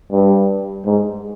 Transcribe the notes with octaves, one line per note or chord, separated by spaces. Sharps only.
G2
G#2